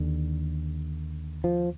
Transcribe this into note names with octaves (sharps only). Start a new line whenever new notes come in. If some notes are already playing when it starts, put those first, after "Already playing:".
Already playing: D#2 D3
F3